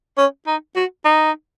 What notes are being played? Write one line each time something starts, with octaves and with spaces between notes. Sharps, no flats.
C#4
D#4
F#4
D#4